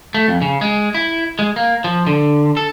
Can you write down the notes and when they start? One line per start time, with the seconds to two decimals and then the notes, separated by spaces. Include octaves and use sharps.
0.14 A3
0.28 F2
0.42 C#3
0.61 G#3
0.94 E4
1.39 G#3
1.56 A#3
1.84 F3
2.07 D3
2.57 A4